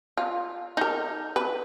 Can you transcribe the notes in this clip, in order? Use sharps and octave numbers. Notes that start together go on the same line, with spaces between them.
F4
D#4 A#4
B4